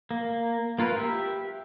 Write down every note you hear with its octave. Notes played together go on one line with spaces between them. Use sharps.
A#3
A#3 F4 A#4 B4
G4 E5